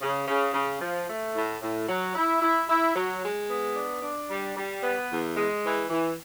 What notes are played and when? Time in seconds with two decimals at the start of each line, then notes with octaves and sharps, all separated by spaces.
0.01 C#3
0.28 C#3
0.54 C#3
0.81 F3
1.08 A3
1.35 A2
1.62 A2
1.88 F#3
2.15 E4
2.41 E4
2.68 E4
2.96 F#3
3.22 G#3
3.49 B3
3.76 D4
4.02 D4
4.29 G3
4.56 G3
4.83 B3
5.10 E2
5.36 G#3
5.63 E3
5.90 E3